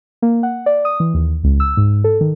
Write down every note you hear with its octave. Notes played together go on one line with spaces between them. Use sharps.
A#3
F#5
D5
D#6
E3
D#2
C#2
E6
G#2
A4
D#3